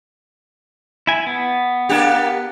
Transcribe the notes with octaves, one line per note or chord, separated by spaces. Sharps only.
E4 G#5
B3
A#3 D4 G4